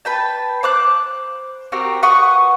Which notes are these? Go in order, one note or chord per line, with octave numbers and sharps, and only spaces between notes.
B4 G5 A5
C5 D6 F#6
C4 F#4 G4 A#4
B4 F#5 C#6 D#6